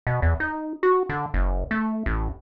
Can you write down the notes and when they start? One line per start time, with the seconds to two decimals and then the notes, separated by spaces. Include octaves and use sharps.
0.07 B2
0.22 E2
0.40 D#4
0.83 F#4
1.09 D3
1.34 F#1
1.71 A3
2.06 A1